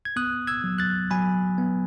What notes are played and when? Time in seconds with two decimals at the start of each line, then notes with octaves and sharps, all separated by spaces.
0.05 G#6
0.16 B3 D#6 F#6
0.47 E6 G#6
0.64 F#3
0.78 F#6 A6
1.11 F#3 G#5 B5
1.58 B3